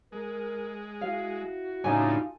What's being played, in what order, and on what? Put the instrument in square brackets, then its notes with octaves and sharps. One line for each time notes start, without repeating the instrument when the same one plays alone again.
[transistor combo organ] G#3 [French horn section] A#4
[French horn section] E4 F#4 [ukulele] F5
[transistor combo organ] A2 C#3 D4 [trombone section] D#4 F4 [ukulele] A4 G#5